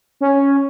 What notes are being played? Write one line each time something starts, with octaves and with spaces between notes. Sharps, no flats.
C#4